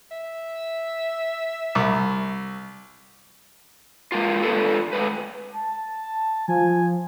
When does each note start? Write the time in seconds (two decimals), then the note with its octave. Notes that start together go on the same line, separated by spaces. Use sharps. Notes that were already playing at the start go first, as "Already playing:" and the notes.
0.11 E5
1.75 C2
4.12 G#3 A#3 F4
4.43 G#3 F4 A4 B4
4.93 G#3 A3 B4
5.54 A5
6.48 F3 G#5